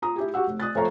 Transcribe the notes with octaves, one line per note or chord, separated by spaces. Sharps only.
F4 A#5 D#6
E4 G4 G#4
F#4 G4 F#5 E6
F1
D5 D#6 F#6 A6
F2 F3 A3 C#5 F5 A#5